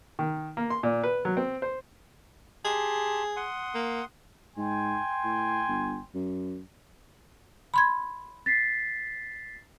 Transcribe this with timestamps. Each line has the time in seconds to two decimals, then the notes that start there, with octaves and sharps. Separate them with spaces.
0.19 D#3
0.57 A#3
0.70 C6
0.83 A#2
1.04 B4
1.25 F#3
1.37 C4
1.62 C5
2.65 G4 G#4 A5 C6
3.36 F#5 C6 D#6
3.74 A#3
4.57 G#2 G5 G#5 C6
5.24 A2
5.68 G1
6.14 F#2
7.74 B5 C6 G#6
8.46 A6 B6 C7